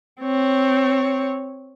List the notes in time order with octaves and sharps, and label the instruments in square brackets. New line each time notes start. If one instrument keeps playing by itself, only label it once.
[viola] C4 C#5